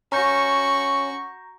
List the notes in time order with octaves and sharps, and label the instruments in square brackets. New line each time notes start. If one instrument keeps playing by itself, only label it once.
[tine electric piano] C#4 [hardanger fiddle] F#4 C#6 [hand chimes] A#5 G6 A#6